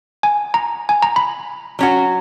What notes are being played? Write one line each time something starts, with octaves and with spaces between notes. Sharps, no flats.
G#5
A#5
G#5
A#5
B5
F#3 C#4 F#4